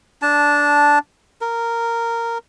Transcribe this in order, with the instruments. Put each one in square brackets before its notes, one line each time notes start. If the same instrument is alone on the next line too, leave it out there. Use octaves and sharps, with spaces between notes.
[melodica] D4 A5
A#4